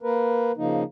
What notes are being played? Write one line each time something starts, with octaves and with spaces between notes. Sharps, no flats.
A#3 A#4 B4
C#3 F3 A#3 D#4